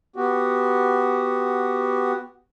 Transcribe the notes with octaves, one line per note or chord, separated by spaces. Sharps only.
B3 F#4 G4